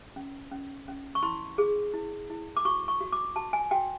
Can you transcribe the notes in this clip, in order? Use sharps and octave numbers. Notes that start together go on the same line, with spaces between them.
C#4
C#4
C#4
C#6
E4 C6
G#4
E4
E4
D6
F#4 C#6
C#6
F#4
D6
F#4 A5
G#5
F#4 G5